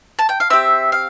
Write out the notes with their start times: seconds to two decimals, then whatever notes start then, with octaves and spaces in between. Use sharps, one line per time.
0.19 A5
0.29 G5
0.40 F5
0.50 C4 G4 E5
0.92 F5